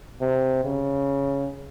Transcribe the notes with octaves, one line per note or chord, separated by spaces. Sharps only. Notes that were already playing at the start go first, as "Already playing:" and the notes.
C3
C#3